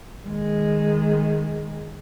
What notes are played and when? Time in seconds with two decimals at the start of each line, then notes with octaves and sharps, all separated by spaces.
0.23 D#3 G#3